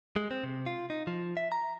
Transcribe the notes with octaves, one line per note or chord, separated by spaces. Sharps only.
G#3
C4
C3
F4
D#4
F3
E5
A#5